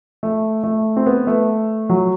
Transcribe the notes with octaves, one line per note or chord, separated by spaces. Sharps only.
A3
A3
C4
B3
A3
F#3